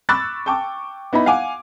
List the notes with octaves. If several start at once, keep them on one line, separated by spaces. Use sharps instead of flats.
B5 C#6 D6 E6 F#6 A6
G5 A5 C#6 D6
B3 D#4 E4 B5
F5 F#5 G#5 D6